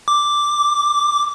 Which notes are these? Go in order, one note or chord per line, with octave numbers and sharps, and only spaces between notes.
D6